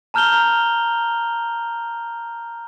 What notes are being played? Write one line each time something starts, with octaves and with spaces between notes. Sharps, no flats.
A5 A#5 F6 G6 F7 G7